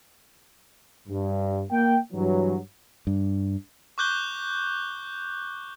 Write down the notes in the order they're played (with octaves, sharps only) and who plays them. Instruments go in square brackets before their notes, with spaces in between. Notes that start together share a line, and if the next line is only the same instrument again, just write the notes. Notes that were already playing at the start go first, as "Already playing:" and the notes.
[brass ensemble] G2
A#3 G5
G2 E3 F#3
[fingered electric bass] G2
[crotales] C#6 D6 F#6 G6 G7